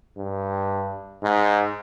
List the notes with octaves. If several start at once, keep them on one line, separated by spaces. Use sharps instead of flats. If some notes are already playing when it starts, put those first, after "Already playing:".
G2
G#2